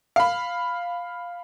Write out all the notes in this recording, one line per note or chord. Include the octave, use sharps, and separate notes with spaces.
F5 B5